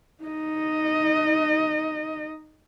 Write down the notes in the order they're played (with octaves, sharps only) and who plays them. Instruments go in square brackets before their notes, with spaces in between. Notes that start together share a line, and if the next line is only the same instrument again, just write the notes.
[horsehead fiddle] D#4 D#5